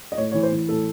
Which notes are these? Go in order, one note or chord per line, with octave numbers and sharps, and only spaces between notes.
D#5
A2 C#5
E3 C#5
C5
E3
A2 A4